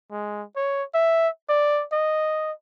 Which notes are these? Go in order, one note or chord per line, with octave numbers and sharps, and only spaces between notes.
G#3
C#5
E5
D5
D#5